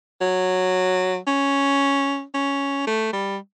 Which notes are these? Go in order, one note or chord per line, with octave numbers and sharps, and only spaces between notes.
F#3
C#4
C#4
A3
G3